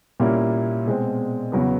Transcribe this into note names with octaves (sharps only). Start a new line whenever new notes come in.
A#2 G3 A#3 C#4 E4
B2 G#3 C4
E2 C#3 F#3 B3